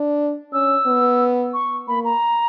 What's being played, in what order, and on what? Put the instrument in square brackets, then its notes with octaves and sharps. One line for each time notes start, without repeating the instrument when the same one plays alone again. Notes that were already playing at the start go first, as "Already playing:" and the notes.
Already playing: [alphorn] D4
[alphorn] C#4 [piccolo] E6
[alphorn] B3
[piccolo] C#6
[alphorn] A#3 [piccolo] B5
[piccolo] A#5